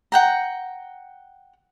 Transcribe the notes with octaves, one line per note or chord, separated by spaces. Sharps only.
F#5 G5 A#5